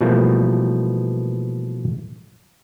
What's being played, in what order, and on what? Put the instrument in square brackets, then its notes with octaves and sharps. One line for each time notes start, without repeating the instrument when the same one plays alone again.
[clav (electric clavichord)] B2 E3 F3 G3 A3 A#3